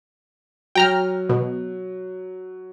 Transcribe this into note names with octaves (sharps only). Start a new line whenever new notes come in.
F#3 G5 A#5 F6
B2